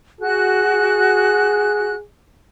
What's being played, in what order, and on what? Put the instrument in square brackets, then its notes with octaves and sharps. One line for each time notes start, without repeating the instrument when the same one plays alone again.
[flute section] F#4 F#6 [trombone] G#4